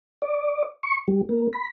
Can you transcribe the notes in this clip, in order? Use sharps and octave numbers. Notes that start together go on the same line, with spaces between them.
D5
C#6
G3
A#3
B5